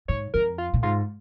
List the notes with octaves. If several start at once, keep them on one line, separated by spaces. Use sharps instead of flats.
G#2 C#5
F2 A#4
F4
A#2
G#2 F4